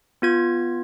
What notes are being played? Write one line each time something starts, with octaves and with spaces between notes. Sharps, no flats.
B3 F4 G#6